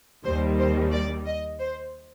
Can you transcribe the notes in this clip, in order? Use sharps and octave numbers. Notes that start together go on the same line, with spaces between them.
D#2 D#3 G3 C5
C5
D5
D#5
C5